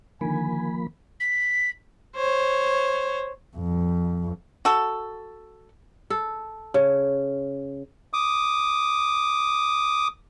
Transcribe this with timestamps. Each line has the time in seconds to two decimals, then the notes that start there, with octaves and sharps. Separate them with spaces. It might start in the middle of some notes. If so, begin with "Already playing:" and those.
0.21 D3 D#3 F3 A#3 G#5 B5
1.20 B6
2.16 C5 C#5
3.57 F2
4.65 F#4 A4
6.10 A4
6.74 C#3
8.13 D6 D#6